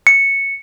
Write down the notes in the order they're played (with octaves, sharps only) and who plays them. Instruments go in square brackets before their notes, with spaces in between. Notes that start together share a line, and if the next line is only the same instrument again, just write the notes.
[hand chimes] C#7